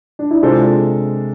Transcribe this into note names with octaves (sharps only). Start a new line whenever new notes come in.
D4
E4
C3 G#3 D4 F4 A4 C5